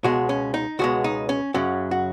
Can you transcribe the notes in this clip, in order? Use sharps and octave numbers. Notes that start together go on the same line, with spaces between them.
C#2 B2 G#3 F#4
C#4
D#4
C#2 B2 G#3 F#4
D#4
C#4
F#2 C#3 F#3 C#4
F#4